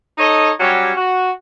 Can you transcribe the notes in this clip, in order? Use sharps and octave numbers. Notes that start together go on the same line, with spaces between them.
D#4 A4 C#5 D#5
F#3 G3 C#4 F#4 G4 C#5
F#4